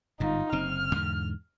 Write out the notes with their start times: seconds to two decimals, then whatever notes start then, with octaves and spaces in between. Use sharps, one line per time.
0.20 G1 G#2 D#4 F4
0.52 F#1 C3 C4 F6
0.95 E2 G#2 D3